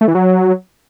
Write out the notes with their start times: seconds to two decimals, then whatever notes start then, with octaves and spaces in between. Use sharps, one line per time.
0.01 A3
0.08 E3
0.15 F#3